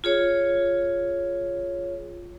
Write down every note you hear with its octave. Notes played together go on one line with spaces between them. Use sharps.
F4 G#4 C#5